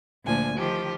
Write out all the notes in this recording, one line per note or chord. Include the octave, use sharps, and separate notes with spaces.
D2 A#2 F3 D4 G#5
D#3 F3 G4